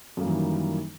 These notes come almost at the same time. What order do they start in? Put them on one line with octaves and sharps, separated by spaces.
F#2 A#3 G3 E3 D#3